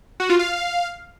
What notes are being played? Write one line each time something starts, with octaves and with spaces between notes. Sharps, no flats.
F#4
F4
F5